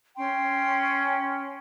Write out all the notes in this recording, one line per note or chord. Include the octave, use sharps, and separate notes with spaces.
C#4 G5 C6